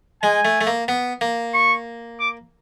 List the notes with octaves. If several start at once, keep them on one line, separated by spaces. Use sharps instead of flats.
G#3 G#5
A3
A3
A#3
B3
A#3
C#6
D6